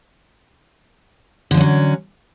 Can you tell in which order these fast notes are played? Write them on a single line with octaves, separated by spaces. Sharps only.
D3 F3 C#4 F#3